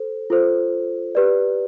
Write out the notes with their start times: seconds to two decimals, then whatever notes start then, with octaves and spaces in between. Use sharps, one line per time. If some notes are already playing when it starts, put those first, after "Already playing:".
Already playing: A4 C5
0.30 F4 A4 C5
1.15 G4 B4 D5